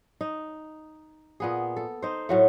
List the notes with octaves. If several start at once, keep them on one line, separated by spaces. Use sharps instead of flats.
D#4
A#2 B3 G#4
A4
D#4 C5
A2 F#3 A3